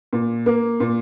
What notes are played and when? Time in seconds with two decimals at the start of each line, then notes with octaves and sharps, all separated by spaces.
0.13 A#2
0.46 A#3
0.80 A#2